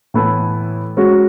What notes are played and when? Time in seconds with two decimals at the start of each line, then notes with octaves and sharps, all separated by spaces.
0.14 A2 E3 B3 E4 A4
0.97 G#3 C#4 F#4